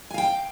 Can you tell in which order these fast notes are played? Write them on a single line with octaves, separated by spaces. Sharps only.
G#5 F5 G5